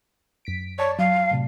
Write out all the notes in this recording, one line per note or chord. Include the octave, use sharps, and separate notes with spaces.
F#2 B6 D7
C#5 D5 A5
F#3 F5
A2 C3